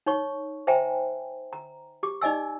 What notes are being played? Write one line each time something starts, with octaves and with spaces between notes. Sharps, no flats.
D#4 C#5 C#6
C5 E5 G5 G#5 A#5
A#5
G4 D6
D#4 D5 D#5 G#5 E6